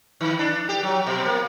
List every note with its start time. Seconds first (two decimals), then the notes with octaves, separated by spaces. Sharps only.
0.21 D#3
0.39 D4
0.69 G4
0.83 F#3
1.07 B2
1.26 A#3